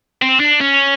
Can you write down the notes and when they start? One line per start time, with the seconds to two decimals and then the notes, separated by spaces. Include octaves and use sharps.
0.22 C4
0.40 D4
0.61 C#4